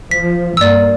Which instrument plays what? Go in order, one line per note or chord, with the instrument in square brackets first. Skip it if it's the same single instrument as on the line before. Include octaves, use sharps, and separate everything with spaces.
[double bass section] F3 [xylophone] B6
[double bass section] G2 A#3 [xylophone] D5 E6